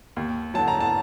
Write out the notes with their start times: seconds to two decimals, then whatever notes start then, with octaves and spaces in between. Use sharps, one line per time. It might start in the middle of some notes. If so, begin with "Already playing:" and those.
0.16 D#2
0.54 D3 F#3 A5
0.68 A#5
0.80 A5